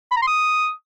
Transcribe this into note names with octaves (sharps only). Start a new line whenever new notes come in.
B5
A#5
C6
D#6